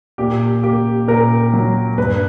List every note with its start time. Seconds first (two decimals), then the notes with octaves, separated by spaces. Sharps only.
0.18 A#2 G4
0.63 A#3 G4
1.08 A#2 A#4
1.53 F#3
1.98 G2 B4